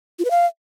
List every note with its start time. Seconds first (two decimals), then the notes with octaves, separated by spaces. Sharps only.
0.19 F4
0.25 B4
0.31 F5